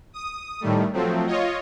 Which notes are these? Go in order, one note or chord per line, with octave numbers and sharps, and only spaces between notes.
D#6
A2 D#3 G3 A3
F3 F#3 A3 C4
F4 C#5 D#5